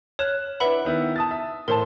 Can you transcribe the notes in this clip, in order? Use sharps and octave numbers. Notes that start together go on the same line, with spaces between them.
C#5 F6 F#6 E7
D4 E4 B4 E5 F#5 B5
D#3 B3 E4
A5 D#6 A6
E5
A2 A#4 C5 A5